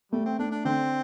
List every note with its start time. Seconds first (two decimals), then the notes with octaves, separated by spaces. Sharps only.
0.12 G3 A3
0.26 C4
0.39 A3 D4
0.51 D4
0.65 D3 C4